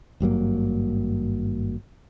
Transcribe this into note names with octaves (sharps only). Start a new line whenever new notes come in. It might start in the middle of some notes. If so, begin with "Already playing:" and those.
G#1 G2 F#3 A#3